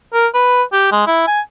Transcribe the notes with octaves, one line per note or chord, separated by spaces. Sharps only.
A#4
B4
G4
G#3
E4
G#5